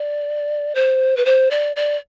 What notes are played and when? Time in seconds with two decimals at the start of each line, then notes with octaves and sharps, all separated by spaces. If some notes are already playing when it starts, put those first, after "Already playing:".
Already playing: D5
0.75 C5
1.17 B4
1.25 C5
1.51 D5
1.76 D5